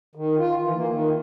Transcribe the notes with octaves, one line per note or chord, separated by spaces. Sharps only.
D#3
F4
E3
A#3
D#3